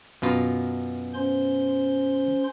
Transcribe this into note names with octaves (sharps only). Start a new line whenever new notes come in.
F#2 B2 F4
C#4 C5 C6